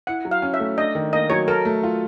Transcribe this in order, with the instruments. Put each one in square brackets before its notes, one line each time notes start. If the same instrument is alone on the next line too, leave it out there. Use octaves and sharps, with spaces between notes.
[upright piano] E4 [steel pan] F#5
[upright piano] F#3
[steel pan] F5
[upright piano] C#4
[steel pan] E5
[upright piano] A3
[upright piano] D4 [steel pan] D#5
[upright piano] D#3
[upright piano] A#3 [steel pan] D#5
[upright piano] F#3 [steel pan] C#5
[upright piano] A4 [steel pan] A#4
[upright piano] A3
F4